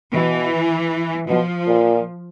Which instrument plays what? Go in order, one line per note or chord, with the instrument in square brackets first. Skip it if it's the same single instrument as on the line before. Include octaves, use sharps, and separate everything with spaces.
[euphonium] B2 [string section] E3
[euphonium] B2 [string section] F3
[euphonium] A#2